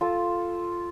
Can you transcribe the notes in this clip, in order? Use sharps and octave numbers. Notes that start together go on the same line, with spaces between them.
F4 A4